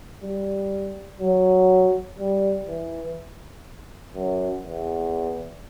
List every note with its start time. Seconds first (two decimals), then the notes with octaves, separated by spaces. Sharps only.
0.23 G3
1.20 F#3
2.19 G3
2.67 E3
4.14 F#2
4.63 E2